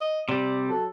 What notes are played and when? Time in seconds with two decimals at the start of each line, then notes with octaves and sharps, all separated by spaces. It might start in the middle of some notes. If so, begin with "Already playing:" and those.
0.01 D#5
0.29 C3 G3 D5
0.69 F#3 A4